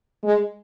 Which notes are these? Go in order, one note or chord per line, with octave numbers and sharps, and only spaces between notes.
G#3